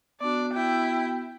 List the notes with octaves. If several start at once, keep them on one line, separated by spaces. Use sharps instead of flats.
B3 D4 F#4 D5
E4 G5